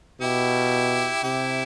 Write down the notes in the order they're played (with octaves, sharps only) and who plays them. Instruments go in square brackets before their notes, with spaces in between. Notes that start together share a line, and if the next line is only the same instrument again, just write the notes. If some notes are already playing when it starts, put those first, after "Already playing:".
[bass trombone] B2 [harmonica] E4 G4
[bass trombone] C3 [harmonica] E4 G4